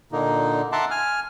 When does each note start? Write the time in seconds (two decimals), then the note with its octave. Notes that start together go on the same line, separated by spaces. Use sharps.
0.12 A#2 D3 A#3 D#4
0.72 E5 F#5 A5 A#5 C6 D6
0.91 G#5 F6